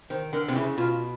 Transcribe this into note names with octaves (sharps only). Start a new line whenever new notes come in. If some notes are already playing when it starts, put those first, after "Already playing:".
D#3 C5
D3 A#4
C3
C#3 E4
B2 F4